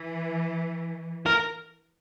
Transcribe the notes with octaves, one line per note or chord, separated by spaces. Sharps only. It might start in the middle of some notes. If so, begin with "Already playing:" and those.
Already playing: E3
A#4